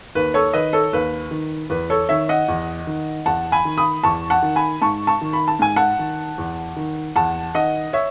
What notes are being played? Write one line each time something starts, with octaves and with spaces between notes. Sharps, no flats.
D#2 B4
A4 C#5
D#3 B4 D#5
A4 C#5
D#2 B4
D#3
E2 B4
A4 C#5
D#3 C#5 E5
D#5 F#5
E2
D#3
E2 F#5 A5
G#5 B5
D#3
B5 D#6
E2 A5 C#6
F#5 A5
D#3
G#5 B5
G#2 A5 C#6
A5 C#6
D#3
B5
A5
G#2 G#5
F#5 A5
D#3
E2
D#3
E2 F#5 A5
D#3 D#5 F#5
C#5 E5